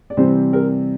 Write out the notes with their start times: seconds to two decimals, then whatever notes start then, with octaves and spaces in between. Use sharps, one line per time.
0.10 D5
0.17 C3 E3 G3 C4 C5
0.53 A#4